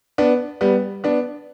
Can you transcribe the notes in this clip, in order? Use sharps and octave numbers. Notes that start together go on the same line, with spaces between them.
B3 D4
G3 B3
B3 D4